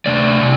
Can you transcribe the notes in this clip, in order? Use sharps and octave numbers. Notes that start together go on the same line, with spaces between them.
C3 A3 D4 D5
C3